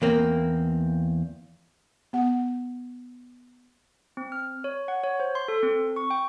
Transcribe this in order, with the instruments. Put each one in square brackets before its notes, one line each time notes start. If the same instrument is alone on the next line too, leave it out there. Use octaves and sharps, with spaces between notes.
[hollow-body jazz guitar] E2 A#3 C4
[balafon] B3 F#5
[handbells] C4
F6
C#5
F#5
C#5
C5
C6
A4
C4
C#6
G5